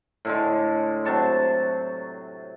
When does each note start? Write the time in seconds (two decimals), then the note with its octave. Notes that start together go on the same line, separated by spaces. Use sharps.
0.25 A2 D3 G#3
1.05 C3 F#3 A5 C#6